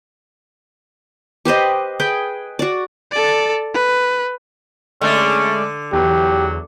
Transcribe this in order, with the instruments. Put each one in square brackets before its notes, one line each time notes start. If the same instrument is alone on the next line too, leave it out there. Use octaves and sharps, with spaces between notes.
[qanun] G4 B4 C5 D#5
G#4 B4 G5
F#4 D5
[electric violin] A4 D5
B4
[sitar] D3 [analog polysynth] G#3 A3 D5 [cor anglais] C#4
[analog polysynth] E2 [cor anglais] F#3 [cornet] G4